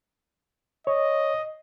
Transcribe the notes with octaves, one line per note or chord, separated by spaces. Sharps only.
C#5 D#5